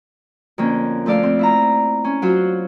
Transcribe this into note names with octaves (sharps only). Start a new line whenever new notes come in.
F2 D3 A#3 C#4
F3 A3 A4 D5 F5
C4
E4 E5 A#5
C#4
F#3 F4 F#4 C5